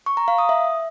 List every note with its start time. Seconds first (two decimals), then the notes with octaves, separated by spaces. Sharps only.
0.06 C#6
0.17 A#5
0.28 F5
0.38 D#6
0.49 E5